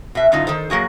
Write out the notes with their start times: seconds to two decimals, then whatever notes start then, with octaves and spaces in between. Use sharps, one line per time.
0.15 B2 E5
0.32 F#2 A2 D3 D#4 F4
0.47 D#3 A4 C5
0.70 F#3 A#3 F#4 G#4